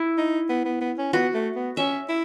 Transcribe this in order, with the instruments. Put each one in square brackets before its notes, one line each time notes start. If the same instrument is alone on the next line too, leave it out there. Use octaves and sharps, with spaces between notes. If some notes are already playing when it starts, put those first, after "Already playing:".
Already playing: [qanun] E4
[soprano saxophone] D#4
B3
B3
B3
C#4
[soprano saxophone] B3 [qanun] F#4
[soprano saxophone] A3
B3
[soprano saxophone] C#4 [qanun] E5
[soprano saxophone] E4